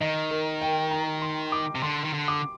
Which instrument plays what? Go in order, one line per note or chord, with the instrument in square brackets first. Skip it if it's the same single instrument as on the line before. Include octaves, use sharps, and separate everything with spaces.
[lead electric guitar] D#3 [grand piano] D#5
[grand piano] A#4
G5
A#5
C6
D6
[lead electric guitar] C3
[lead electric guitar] D3 [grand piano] C6
[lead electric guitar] D#3
D3
[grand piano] D6